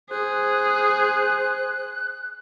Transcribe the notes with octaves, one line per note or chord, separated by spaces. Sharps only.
G#4 C5 F#6